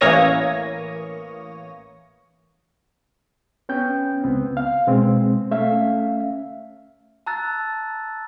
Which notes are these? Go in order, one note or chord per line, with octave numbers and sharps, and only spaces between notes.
A1 E3 A#3 C#5 D#6 A#6
B3 C#4 G5 G6
C#2 B3 C4
F5
B2 G#3 C4
A3 C#4 E5 F5
A5 A#5 E6 F#6 A6